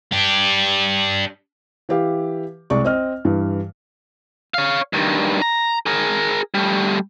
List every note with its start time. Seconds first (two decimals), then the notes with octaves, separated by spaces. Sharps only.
0.12 D4 G4
1.89 E3 E4 G4 B4 F5
2.70 C2 G#3 D5 C#6
2.84 C4 D#5 F6
3.25 G2 E3
4.54 C#5 F5
4.93 G2 D#3
5.42 A#5
5.86 G#4 A#4
6.54 G3 A3